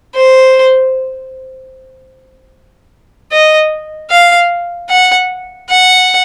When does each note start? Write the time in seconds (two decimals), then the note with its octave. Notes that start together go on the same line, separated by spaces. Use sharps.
0.15 C5
3.32 D#5
4.10 F5
4.89 F#5
5.69 F#5